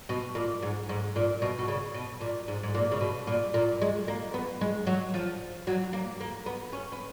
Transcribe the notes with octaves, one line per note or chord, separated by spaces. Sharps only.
B2
A#2
G#2
G#2
A#2
B2
B2
C#3
B2
A#2
G#2
G#2
A#2
C#3
B2
A#2
A#2
G#3
A#3
B3
G#3
F#3
F3
F#3
A#3
A#3
B3
C#4
B3